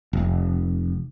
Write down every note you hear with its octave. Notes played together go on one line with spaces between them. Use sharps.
F1